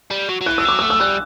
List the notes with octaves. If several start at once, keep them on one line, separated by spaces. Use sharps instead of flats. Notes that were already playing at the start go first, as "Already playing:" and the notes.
G3
F#3
F#3
E3 F#6
E6
F#3 D6
E6
A3
E6
G3 F#6